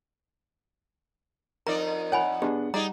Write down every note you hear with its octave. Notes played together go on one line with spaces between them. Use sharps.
F2 D#4 A#4 D5 A#5
C#5 F#5 G#5 B5
B3 D4 G4 G#4
G3 D#4 G#4 D5 A#5